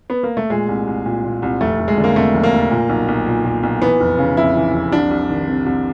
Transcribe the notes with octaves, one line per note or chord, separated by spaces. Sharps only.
B3
A#3
A3
A#2 G#3
C2
C2
A#2
A#2
C2
F1 A3
F1
G#3
D3
A#3
F2 A3
F1
A#3
F1
A#2
B1
B1
A#2
A#2
B1
E3 B3
F1
C#3
F2 E4
E3
F1
C2 D4
C2
D#3
C3
C2